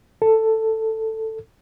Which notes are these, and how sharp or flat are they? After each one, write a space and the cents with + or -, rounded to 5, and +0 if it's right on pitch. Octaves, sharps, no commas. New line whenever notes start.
A4 +10